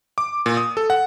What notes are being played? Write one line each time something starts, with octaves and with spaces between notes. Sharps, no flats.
D6
A#2
D#6
A4
F#5